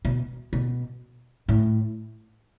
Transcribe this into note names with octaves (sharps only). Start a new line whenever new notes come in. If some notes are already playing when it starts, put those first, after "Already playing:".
B2
B2
A2